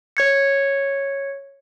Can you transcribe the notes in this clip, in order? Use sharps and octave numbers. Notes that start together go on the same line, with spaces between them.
C#5 G#6 C#7